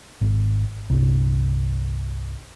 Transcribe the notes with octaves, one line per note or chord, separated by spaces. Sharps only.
G#1
G1 C2